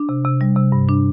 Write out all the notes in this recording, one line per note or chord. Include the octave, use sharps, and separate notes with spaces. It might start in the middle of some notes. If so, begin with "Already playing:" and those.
Already playing: D4
C3
C3
G3
C3
G2
D4